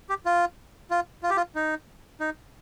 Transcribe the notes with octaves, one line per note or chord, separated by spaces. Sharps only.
G4
F4
F4
F4
G4
F4
D#4
D#4